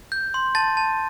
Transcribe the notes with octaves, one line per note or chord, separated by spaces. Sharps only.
G6
C6
A5 A6
A5